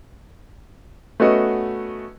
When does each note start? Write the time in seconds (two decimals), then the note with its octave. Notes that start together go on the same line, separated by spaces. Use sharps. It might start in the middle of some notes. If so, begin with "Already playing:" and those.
1.20 A3 B3 C#4 F#4 D#5